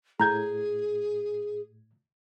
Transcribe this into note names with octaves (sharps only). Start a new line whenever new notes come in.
A2 G#4 A#5 G6 G#6